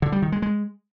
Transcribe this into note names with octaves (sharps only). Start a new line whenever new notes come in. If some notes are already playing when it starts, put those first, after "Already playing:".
D3
G3
D#3
G#3
G#3